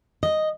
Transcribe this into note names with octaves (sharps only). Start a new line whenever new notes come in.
D#5